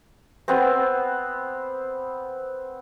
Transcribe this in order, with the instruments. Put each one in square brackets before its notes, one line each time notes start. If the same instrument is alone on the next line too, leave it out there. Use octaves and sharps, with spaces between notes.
[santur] B3 C4